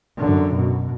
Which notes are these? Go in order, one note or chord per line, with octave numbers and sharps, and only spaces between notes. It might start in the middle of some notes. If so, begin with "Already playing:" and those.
F#2 D3
B2